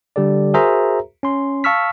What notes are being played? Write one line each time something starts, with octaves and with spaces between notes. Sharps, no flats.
D3 G3 G4 A4 D5
F#4 G#4 A#4 C5 E5 A#5
C#4 C6
F5 A5 C#6 E6 F6 B6